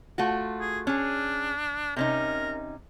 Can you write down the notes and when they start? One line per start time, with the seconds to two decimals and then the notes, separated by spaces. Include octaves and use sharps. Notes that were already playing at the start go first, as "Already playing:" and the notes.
0.18 A3 F4 F#4
0.60 G#4
0.87 C#4 D4 G#4
1.96 C3 C#4 D#4 A#4